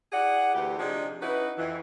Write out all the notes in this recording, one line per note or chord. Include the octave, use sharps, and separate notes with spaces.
E4 G#4 D5 F#5
D2 E3 G4
C3 F3 D4 D#4 G4 G#4
C#4 D#4 E4 F#4 B4
F2 E3